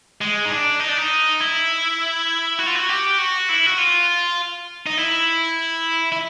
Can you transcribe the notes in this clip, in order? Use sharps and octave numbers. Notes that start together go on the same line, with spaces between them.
G#3
D#4
D4
D#4
D4
D#4
E4
F#4
F4
F#4
G4
F#4
E4
F#4
F4
D#4
E4
E4